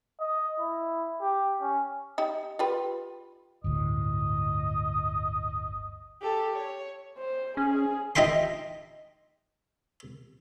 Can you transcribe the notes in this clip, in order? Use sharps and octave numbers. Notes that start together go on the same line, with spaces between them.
D#5
E4
G4
C#4
D#4 G4
F4 G4 B4
G1 D2 A2 D#5
G4 A4
C#5
C5
C#4 G#4
D#4 D#5 E5 G5 C6